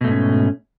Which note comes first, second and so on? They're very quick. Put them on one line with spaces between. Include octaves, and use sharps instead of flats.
B2 A3 G#2 C#4